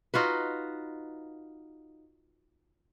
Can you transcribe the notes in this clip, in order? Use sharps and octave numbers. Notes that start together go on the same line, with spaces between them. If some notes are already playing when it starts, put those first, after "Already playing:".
D#4 F4 F#4 B4